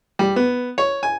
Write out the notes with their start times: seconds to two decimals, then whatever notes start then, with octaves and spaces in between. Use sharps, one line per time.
0.19 G3
0.36 B3
0.78 C#5
1.03 G#5